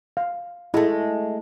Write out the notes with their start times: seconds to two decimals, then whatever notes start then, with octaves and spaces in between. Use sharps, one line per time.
0.17 F5
0.74 G#3 A3 E4